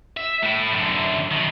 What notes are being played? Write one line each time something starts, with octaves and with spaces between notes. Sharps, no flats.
E5
A2 E4
F#2 D3
B2 D#3